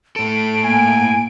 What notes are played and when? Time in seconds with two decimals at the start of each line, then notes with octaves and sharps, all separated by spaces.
0.16 A2 A4 D7
0.64 A#3 G#5